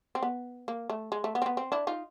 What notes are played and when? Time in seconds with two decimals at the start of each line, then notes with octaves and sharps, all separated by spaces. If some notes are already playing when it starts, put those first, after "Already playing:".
0.15 C4
0.23 B3
0.68 A#3
0.90 A3
1.12 G#3
1.24 A3
1.35 B3
1.42 C4
1.46 B3
1.57 C4
1.72 D4 E4
1.87 D#4 F4